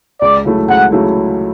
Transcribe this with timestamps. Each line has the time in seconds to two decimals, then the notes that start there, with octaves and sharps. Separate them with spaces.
0.22 C#2 D5
0.45 C#3 F#3 A3 E4
0.69 C#2 F#5
0.92 C#3 F#3 A3 E4